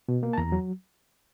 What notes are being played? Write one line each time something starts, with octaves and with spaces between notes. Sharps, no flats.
B2
A#3
A5
E2 A#5
F#3